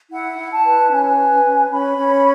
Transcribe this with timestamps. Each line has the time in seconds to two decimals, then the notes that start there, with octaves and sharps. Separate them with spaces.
0.11 E4 F#5
0.38 E4
0.52 A5
0.65 B4
0.91 C#4 G#5
1.18 B4
1.44 C#4
1.70 C#4 B5
1.97 C#4